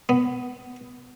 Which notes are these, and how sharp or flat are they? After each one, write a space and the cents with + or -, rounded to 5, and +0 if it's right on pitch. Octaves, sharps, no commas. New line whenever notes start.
B3 +15